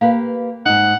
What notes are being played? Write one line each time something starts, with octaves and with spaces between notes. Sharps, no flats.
A#3 G4 B4 F5
G#2 D#4 F#5